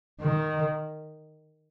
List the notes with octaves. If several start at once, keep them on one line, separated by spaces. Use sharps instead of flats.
D#3